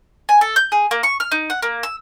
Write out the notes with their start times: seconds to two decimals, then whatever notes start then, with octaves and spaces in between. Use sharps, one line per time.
0.29 G#5
0.41 A4
0.56 G6
0.72 G#4
0.91 A#3
1.03 C#6
1.20 F6
1.31 D#4
1.50 F#5
1.62 A#3
1.83 E6